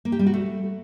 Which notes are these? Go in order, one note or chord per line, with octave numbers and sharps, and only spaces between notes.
A#3
G4
G3
F#4
A3